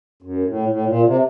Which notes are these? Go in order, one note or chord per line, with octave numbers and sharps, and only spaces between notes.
F#2
A2
A2
A#2
C3